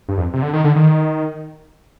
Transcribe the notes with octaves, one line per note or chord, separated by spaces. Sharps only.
G2
F2
C3
D3
D#3
D3
D#3